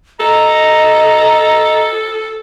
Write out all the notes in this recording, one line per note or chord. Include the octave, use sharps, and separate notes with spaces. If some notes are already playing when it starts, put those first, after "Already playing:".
A4 D#5 A#5